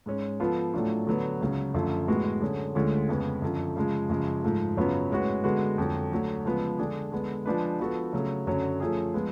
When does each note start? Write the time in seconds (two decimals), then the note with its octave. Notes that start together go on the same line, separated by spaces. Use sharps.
0.06 G#2 G#3 C#4
0.40 F3 B3 F4 A4
0.74 A2 F#3 A3 D4 F4
1.07 D3 F#3 B3
1.40 C#2 C#3 F#3
1.74 F#2 D3 F3 A3 F4
2.08 A2 G#3 B3 F#4
2.42 D3 F#3 C#4 G#4
2.75 D2 D3 G#3 C#4 F4
3.09 F2 C#3 G#3 B3
3.42 F#2 D3 F3
3.76 C#3 F3 G#3
4.09 F#2 C#3 F3 G#3
4.43 G#2 F3 A3
4.77 F#2 C#3 F#3 B3 F4
5.11 A2 G#3 C#4 F#4 B4
5.44 D3 G#3 B3 F#4
5.78 F2 D3 F#3
6.12 D2 D3 F#3
6.45 C#3 F3 G#3 B3
6.79 D3 G#3 D4 G#4
7.12 D3 G#3 B3
7.46 F3 G#3 D4 G#4 B4
7.79 F3 B3 F#4 A4
8.13 C#3 F#3 A3
8.47 F#2 D3 F#3 C#4
8.80 F3 A3 C#4 F4 G#4
9.14 F3 G#3 B3